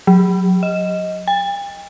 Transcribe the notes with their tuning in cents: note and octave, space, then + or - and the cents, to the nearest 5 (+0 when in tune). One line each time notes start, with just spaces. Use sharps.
F#3 -20
D#5 +10
G5 +40